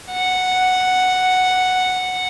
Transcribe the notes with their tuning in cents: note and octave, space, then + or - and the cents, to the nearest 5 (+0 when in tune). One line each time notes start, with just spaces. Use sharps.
F#5 +0